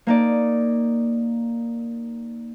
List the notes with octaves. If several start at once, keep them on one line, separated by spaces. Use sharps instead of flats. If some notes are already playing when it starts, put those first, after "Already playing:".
A#3 D#4 D5